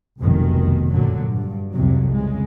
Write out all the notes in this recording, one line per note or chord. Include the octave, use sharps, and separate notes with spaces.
F1 C2 F#2 B2 D#3
F#2 A#2 D3 F#3
G2
C2 F2 C3 F#3
C#3 G#3